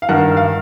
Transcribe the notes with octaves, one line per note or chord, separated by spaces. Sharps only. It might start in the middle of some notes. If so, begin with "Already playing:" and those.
F5
G2 D#3 F#5
F5